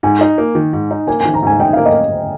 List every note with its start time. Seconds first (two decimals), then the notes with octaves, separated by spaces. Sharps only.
0.03 G#2 G#5
0.21 D#4
0.38 A#3
0.55 D#3
0.73 G#2
0.91 D#4
1.07 A#3 G#5
1.20 D#3 G#5
1.34 A#5
1.43 G#2 G#5
1.60 D#4 G5
1.73 A#3 F5
1.86 D#5